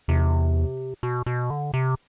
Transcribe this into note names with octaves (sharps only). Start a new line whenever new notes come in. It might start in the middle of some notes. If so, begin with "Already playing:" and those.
E2 C3
B2
B2
D3
C3